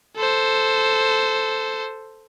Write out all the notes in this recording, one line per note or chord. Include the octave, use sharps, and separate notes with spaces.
A4 C5